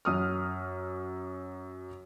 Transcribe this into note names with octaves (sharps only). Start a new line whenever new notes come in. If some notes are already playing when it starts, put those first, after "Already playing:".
F#2 D#6 F6